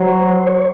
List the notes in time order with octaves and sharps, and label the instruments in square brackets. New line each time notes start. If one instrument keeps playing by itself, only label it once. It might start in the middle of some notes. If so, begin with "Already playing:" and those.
Already playing: [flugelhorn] F#3 [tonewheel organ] C5
[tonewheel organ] C#5